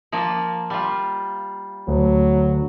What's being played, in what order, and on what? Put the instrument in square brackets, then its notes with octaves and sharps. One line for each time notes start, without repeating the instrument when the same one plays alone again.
[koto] F3 A#3 D5
G3 F4
[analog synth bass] D2 [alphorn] F#3